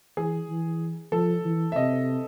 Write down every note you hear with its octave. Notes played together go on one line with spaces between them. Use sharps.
E3 G#4
E3
F3 A4
E3
E5
C3 D#5